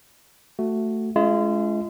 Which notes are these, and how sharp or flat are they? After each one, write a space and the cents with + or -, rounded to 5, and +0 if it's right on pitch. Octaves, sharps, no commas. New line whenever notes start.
A3 +10 F#4 +0
G#3 +25 C#4 +30 F4 -35